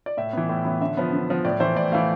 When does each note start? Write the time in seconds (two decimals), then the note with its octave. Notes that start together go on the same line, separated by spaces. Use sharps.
0.06 D5
0.17 A2 E5
0.33 E3 B3
0.49 A2
0.65 E3 B3
0.81 D3 E5
0.97 F3 B3
1.13 D3
1.29 F3 B3
1.45 A2 D5
1.60 E3 A3 C5
1.76 A2 D5
1.92 E3 A3 F5